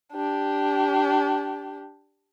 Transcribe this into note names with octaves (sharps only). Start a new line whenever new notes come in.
D4 G4